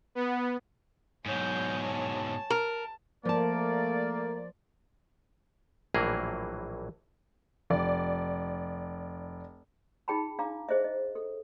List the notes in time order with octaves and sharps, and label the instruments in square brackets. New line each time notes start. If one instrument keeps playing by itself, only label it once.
[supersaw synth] B3
[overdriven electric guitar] G#2 B2 [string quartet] F#3 G6 [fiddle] C#5 G#5
[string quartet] A5
[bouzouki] A#4
[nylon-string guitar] F3 A5 [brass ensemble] A3 A#4 [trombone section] A#3 [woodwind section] D5
[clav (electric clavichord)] A#1 A2 E3 F#3 A#3 G#4
[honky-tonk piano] F1 D5
[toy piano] D#4 F4 G#4 G5 A5 B5
D4 F5 A#5 D6
G#4 C5 D#5 E5
D#5
A4